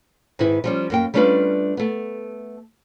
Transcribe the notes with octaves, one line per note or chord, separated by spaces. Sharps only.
G#2 D#3 E4 B4
F3 G3 C#4
F#2 A#3 G5
G3 A3 C#4 D4 F4 B4
A3 B3